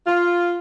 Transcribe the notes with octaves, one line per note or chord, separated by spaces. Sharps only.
F4